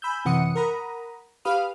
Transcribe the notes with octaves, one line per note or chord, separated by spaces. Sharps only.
G#5 B5 E6 G6
F#2 C3 E3 F#5 D#6 C#7
A#4 F#5 A#5 B5 D#6
G4 B4 F5 B5 D#6 F6